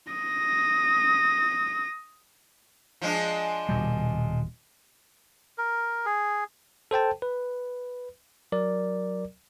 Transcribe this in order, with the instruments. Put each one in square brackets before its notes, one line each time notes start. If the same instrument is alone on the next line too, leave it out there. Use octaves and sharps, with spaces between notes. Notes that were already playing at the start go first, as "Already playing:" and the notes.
[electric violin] D#6 A#6
[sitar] F3 G#3 D4
[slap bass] D#1 B2 G3
[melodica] A#4
G#4
[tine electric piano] A4 C5 G5 A5
B4
F#3 A#4 D5